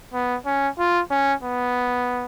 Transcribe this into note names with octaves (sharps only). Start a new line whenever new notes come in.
B3
C#4
F4
C#4
B3